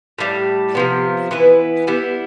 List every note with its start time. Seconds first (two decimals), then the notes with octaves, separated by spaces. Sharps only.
0.18 A2 G3 D4
0.75 C3 F3 B3
1.31 E3 B3 E4 B4
1.87 G3 B3 E4